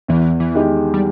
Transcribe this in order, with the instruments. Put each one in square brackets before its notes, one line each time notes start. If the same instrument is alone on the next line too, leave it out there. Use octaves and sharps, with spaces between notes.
[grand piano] E2 [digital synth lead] E3
[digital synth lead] E3
[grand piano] D#3 G#3 D#4 G4
[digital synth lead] G3